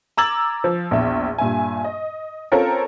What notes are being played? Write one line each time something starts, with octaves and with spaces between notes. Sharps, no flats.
A#5 D6 E6 G#6 A6 F#7
F3
A#1 E2 E5
G2 A#2 E5 G#5
D#5
C4 C#4 F4 A4 A#4 C#5